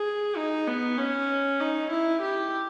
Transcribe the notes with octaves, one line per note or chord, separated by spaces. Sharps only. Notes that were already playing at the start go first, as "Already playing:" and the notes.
Already playing: G#4
D#4
B3
C#4
D#4
E4
G4